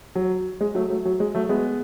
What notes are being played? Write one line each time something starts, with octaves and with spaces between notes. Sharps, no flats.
F#3
G#3
F#3 A3
F#3 A3
F#3
G#3
F#3 A3
G#3 B3